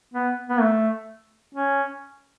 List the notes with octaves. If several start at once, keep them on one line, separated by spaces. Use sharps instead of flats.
B3
B3
A3
C#4